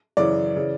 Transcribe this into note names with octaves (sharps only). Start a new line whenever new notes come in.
F#2 C#3 E3 D5
C#3 E3